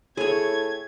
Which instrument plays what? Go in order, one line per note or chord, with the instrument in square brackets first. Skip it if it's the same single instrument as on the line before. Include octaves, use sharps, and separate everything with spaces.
[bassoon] A2 [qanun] G#4 C#5 [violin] G#6